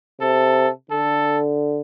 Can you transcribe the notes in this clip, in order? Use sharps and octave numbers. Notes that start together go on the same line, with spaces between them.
C3 A4
D3 A4